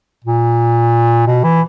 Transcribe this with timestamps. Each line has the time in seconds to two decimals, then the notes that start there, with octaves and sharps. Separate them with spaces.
0.24 A#2
1.27 B2
1.44 E3